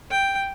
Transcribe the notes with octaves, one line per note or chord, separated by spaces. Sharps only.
G5